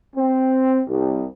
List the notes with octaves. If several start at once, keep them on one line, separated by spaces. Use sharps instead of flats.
C4
C2